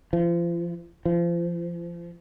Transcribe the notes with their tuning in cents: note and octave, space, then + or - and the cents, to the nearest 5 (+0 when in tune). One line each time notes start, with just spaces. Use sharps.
F3 -35
F3 -30